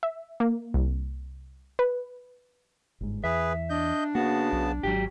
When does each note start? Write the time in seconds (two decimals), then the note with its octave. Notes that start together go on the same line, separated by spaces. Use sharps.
0.03 E5
0.40 A#3
0.74 C2
1.79 B4
3.01 G1 G#2
3.24 E2 G#4 B4 E5
3.70 D4 D#5 G6
4.15 C#3 A#3 B3 F#4 A5
4.53 B1
4.83 G#1 F#3 G4